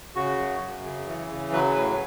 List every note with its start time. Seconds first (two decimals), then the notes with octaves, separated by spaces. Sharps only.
0.15 C#3 F#4
0.38 F#2
0.61 F#2
0.85 C#3
1.06 E3
1.30 C#3
1.52 F#3 B4
1.75 A2 B4